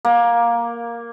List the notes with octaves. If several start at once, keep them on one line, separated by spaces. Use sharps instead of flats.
A#3